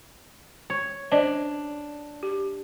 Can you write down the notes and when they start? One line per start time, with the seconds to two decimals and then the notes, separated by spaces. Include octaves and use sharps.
0.70 C#5
1.12 D4 C5 D5 D#5
2.23 G4